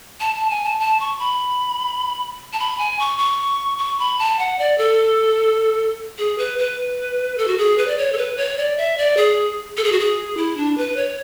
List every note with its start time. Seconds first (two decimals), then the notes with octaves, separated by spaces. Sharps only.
0.20 A5
0.35 A5
0.50 G#5
0.64 A5
0.80 A5
1.00 C#6
1.19 B5
2.53 A5
2.60 B5
2.79 G#5
3.00 C#6
3.18 C#6
3.79 C#6
3.99 B5
4.19 A5
4.39 F#5
4.59 D5
4.78 A4
6.18 G#4
6.38 B4
6.59 B4
7.38 A4
7.48 F#4
7.58 G#4
7.78 B4
7.88 D5
7.98 C#5
8.12 A4
8.17 B4
8.37 C#5
8.58 D5
8.78 E5
8.98 D5
9.17 G#4
9.77 A4
9.84 G#4
9.92 F#4
9.99 G#4
10.37 E4
10.57 D4
10.78 B4
10.97 C#5